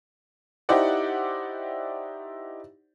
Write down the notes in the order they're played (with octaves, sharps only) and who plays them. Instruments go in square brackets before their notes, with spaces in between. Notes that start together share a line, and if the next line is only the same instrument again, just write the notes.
[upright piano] D#4 E4 G4 C5 D5 F#5